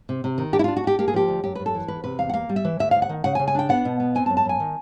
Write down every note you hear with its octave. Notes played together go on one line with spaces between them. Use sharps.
C3
C3
D#3
D4 G4
E4
D4 F4
F#4
D4 G4
A#3 G4
G#4
F3 G4
D2
F#2 G4
F#2 B4
A4
E3
E2 B4
C3 B4
E2 F5
F#5
A#3 F5
G3
E5
E3
D2 E5
D2 F5
F#5
D#3
C#3 F#5
G#5
C#3
G#5
D4 G5
B3 F#5
B2
B3
C4 G#5
A5
F#2
A5
F#2 G#5
D#3